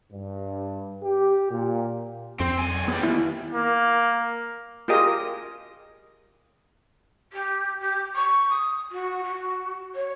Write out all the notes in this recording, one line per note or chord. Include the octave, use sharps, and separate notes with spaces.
G2
G4
A#2
F2 C4
B1 G#5
E2 G3 B3
D#2 E4
A#3
F4 G4 G#4 A#4 D#5
G4
G4
C#6
D#6
F#4
F#4
C#5